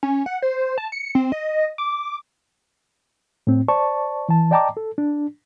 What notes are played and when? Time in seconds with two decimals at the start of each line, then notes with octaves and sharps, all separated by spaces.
0.03 C#4
0.26 F#5
0.42 C5
0.78 A5
0.92 C#7
1.15 C4
1.32 D#5
1.78 D6
3.47 A2 C4
3.68 C5 D5 A5 C#6
4.29 E3 A5
4.51 D5 D#5 G5 A5 A#5 D6
4.77 A4
4.98 D4